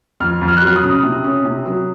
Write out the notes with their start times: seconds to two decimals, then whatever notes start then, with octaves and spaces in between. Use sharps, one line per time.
0.20 F2 F6
0.41 F2
0.48 F6
0.57 F#6
0.62 F#3 F6
0.76 D#6
0.83 C#3
1.03 C3
1.24 C#4
1.45 C3
1.66 F#3